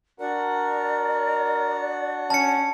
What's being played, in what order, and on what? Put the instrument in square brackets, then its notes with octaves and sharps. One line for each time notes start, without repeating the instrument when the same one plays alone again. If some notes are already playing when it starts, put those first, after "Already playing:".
[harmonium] D4 F#4 F#5 [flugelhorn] A#4 [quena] D5
[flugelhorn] C#4 [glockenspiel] A5 C#7